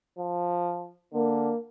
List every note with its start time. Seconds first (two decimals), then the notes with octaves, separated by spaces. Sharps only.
0.19 F3
1.13 D3 A#3